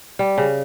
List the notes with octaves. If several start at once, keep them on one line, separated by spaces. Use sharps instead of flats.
G3
C#3